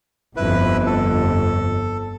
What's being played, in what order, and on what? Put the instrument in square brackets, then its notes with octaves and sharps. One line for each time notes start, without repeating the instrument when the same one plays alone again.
[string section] G1 F2 [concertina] E4 B4
[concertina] A4